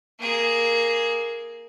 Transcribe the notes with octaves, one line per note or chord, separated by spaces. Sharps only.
A#3 G#4